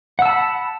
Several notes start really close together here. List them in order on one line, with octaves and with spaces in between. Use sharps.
F#5 E6 A5 B5